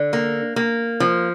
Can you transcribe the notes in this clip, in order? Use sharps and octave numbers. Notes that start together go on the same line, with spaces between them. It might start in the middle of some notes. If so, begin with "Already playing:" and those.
Already playing: D3
A#3
A#3
F3